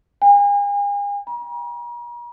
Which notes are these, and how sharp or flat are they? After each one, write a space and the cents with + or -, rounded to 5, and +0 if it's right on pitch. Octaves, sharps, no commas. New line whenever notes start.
G#5 -40
A#5 +40